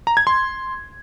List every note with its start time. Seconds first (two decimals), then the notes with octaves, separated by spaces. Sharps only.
0.07 A#5
0.17 G#6
0.27 C6